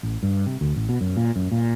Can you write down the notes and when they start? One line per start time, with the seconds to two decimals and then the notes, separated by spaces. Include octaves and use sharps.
0.03 A1
0.23 G2
0.46 C3
0.61 D2
0.76 A1
0.89 B2
1.01 F#2
1.17 A#2
1.36 F#2
1.52 A#2